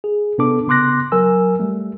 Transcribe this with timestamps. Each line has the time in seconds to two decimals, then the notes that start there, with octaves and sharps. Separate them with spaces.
0.04 G#4
0.38 C3 B3 D4 A4 D6
0.67 C#3 B3 C6 D6 F#6 A#6
1.12 F#3 A#4 G#5 E6
1.60 G3 A3